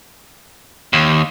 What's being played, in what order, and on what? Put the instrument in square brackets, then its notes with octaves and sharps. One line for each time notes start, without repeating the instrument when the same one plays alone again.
[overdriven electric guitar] D#2